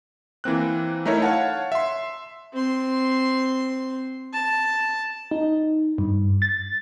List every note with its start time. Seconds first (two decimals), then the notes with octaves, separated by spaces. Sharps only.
0.44 E3 A#3 C4 F#6
1.06 A3 D#4 E4 A#4 C#5
1.22 C#5 F5 F#5 A5
1.72 E5 C6
2.53 C4 C6
4.33 A5
5.31 D#4
5.98 G2
6.42 A6